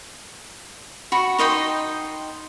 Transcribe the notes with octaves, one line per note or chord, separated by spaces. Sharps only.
F#4 B5 C#6
D#4 D#5 G5 C6